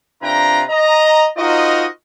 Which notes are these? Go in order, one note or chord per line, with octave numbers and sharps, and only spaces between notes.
C3 D4 F4 B4 G5 A#5
D#5 A#5
D#4 F4 F#4 A#4 C5 D#5